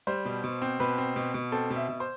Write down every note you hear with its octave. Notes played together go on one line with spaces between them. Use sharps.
G3 C5
B2
B2
C4
B2 B4
C4
B2
B2
C4 A4
B2
E5
B2
C5